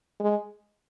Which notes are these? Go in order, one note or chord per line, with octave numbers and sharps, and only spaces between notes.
G#3